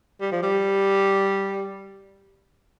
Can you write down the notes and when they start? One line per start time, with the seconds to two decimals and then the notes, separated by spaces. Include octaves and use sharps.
0.20 G3
0.32 F3
0.42 G3